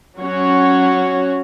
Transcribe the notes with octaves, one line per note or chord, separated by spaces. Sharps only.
F#3 C#4 F#4 C#5